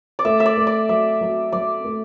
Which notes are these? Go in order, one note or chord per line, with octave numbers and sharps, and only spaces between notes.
D5
A3 E5
E5
D5
A3
D5
F#3 E5
F#3
F#3 D5
A3